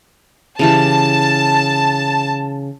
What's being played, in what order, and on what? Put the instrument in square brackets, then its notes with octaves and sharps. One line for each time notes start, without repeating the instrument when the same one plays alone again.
[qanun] C#3 E3 G4 [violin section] A5